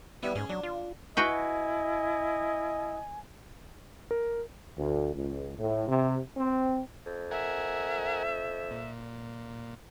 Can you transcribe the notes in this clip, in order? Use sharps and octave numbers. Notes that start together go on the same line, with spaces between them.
G3 B3 E4 B4
G#2 C#4 G#4
F#3 D4
F4
E4 F#4 B4 D#5 G5 G#5
A#4
D2
C#2
A2
C3
C4
F2
A#4 E5 F#5 G#5
A#2